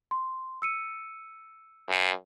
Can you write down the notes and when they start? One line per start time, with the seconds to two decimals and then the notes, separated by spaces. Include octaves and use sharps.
0.11 C6
0.62 E6 C#7 D#7
1.89 F#2